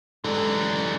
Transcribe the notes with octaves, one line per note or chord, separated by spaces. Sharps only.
F#2 D3 E3 G3 G#3